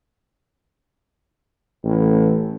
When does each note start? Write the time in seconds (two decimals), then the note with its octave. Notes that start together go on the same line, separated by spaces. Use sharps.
1.83 A1